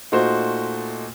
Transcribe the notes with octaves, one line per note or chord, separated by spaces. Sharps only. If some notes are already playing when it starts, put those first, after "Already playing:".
A#2 A3 D#4 F#4 C5